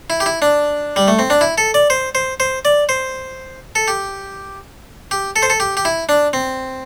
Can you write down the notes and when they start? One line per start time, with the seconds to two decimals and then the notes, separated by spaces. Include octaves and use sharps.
0.10 E4
0.20 G4
0.26 E4
0.42 D4
0.96 G3
1.08 A3
1.19 C4
1.30 D4
1.41 E4
1.58 A4
1.74 D5
1.90 C5
2.15 C5
2.40 C5
2.65 D5
2.89 C5
3.75 A4
3.88 G4
5.11 G4
5.36 A4
5.42 C5
5.50 A4
5.60 G4
5.77 G4
5.85 E4
6.09 D4
6.33 C4